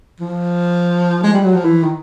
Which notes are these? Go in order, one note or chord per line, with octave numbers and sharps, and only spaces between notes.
F3
G#3
G3
F#3
F3
E3
D#3